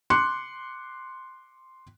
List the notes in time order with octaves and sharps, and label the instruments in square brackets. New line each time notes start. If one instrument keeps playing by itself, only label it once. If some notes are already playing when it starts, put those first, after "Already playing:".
[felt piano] C6 D6 F#6 C#7